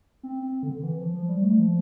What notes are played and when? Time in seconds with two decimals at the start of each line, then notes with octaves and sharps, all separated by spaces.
0.23 C4
0.43 C4
0.63 D3
0.73 D3
0.83 E3
0.99 F3
1.14 F3
1.29 G3
1.43 A3
1.59 F3